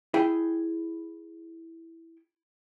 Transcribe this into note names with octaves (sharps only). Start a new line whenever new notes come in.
E4 G#4 G5